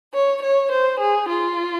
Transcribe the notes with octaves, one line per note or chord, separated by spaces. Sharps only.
C#5
C#5
C5
G#4
F4